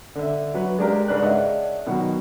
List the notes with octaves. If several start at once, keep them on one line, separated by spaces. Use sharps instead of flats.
D3 E5
F#3 B4
G#3 D4 G4 A#4 F5
G#2 C#3 D4 A#4 B4 F#6
D4 G#4 C#5 D#5 E5 F#5
B2 D#3 F#3 F#4